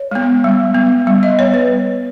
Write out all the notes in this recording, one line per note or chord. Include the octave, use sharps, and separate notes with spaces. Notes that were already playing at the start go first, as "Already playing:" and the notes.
Already playing: C#5
G#3 B3
G3
B3
G3
D#5
B3 C#5
B4